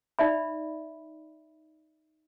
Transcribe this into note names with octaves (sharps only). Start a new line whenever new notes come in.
D#4 D5 E5 B5